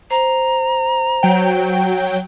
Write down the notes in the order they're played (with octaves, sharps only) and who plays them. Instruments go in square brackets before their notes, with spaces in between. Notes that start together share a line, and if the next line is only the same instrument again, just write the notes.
[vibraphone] C5 [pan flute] A#5
[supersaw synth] F#3 G5